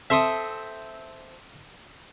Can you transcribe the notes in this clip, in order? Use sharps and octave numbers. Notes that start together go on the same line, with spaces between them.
C4 A4 E5 C6 D#6